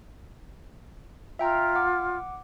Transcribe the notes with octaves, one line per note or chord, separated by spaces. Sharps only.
F4 E5 G5 A#5
F#5 D6